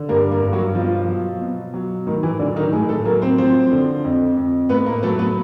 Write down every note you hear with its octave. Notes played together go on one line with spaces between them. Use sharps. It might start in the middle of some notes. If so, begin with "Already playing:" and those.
Already playing: D3
G2 A#3 A#4
A#3 A#4
G2
F#3 F#4
B2 F3 F4
F#3
B2
F#3
A2 D#3 D#4
E3 E4
D3 F#3 D4
D#3 D#4
A2 G#3 G#4
A3 A4
F#3 A#3 A#4
C4 C5
F3 C4 C5
D3
F2
F2
A2 B3 B4
A#3 A#4
F#3 A3 A4
B3 B4